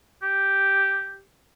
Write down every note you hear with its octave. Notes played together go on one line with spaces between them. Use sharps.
G4